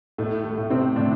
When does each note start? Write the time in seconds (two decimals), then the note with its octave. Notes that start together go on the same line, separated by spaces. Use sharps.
0.18 A2 A3
0.44 A3
0.58 A2
0.70 C3 C4
0.96 A2 D3 D4